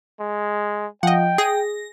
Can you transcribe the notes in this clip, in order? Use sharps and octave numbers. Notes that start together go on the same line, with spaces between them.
G#3
F3 D#5 F#5 G5
G#4 A#6